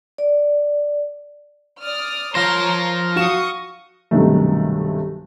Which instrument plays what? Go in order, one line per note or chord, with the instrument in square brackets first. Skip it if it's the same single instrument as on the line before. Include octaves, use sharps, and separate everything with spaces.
[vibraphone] D5
[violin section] D5 D#6 F6
[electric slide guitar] F3 C5 [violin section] A#4 C#5 C6 [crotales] F6 A#6
[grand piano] F#4 F5 E7 [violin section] C#6 D#6
[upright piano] B1 G2 C3 D#3 F#3 A3